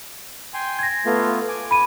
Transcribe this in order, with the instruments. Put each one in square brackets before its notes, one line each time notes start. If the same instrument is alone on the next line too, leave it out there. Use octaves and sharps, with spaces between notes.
[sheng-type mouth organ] G5 G#5 C6
[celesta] G#6 A#6
[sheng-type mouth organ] A3 B3 F4
G#5 D6
[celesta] B5 D#7